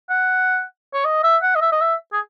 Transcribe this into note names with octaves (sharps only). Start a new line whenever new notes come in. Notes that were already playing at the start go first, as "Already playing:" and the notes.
F#5
C#5
D#5
E5
F#5
D#5
E5
D#5
E5
G#4